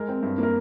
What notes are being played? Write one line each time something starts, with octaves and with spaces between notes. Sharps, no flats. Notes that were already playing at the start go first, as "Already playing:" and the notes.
Already playing: G#3 A#4
C4
G2
A#3 A#4